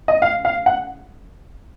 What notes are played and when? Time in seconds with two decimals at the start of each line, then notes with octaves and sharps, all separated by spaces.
0.08 D#5
0.22 F5
0.45 F5
0.66 F#5